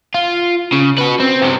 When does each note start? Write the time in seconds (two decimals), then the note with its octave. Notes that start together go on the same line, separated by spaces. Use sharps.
0.15 F4
0.72 C#3
0.98 F#4 B4
1.20 C4
1.42 G2 C3